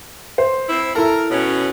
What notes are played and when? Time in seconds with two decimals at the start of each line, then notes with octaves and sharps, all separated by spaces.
0.38 C5
0.69 C4 E4
0.96 E4 A4 A#4
1.31 B2 C#4